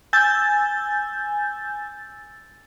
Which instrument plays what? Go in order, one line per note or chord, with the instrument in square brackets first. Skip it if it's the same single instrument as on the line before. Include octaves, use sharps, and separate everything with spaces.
[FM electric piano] G#5 E6 G6 A6